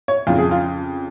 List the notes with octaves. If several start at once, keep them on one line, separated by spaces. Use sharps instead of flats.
C#5
F2 C#3 F4
G#4
F4